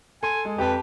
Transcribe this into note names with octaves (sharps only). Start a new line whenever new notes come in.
A4 G#5 C6
G#3
F2 G4 B4 G5 A5